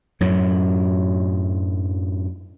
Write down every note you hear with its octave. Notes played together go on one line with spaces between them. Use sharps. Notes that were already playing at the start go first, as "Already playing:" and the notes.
F#2 A2 F#3